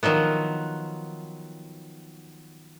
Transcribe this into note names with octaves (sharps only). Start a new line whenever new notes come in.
D#3 F3 F#3 B3